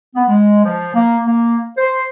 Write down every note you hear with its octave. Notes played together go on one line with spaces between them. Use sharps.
B3
G#3
F3
A#3
A#3
C5